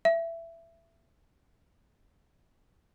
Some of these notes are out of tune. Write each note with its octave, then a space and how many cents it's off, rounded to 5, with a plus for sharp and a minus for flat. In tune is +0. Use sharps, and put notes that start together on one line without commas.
E5 +20